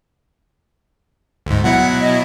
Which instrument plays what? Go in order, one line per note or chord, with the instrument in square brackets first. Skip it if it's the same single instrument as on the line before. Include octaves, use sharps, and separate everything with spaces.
[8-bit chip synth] D2 G#2
[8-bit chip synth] B2 F#3 E4 [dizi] F#5
[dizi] D#5